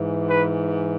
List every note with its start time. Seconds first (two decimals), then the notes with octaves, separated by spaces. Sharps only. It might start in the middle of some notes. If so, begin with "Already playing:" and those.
Already playing: G#2 E3
0.30 B4